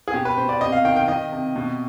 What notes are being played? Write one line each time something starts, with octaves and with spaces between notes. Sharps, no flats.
G#4
B2 G4
B4
B2 C5
D5
C3 D#5
F5
D#3 G5
G5
D#3 D#5
C3
B2